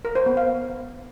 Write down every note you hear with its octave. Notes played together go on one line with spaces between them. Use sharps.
A#4
C5
B3
F5